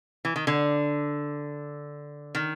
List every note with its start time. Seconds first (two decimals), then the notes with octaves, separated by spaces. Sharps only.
0.25 E3
0.36 D#3
0.47 D3
2.35 D#3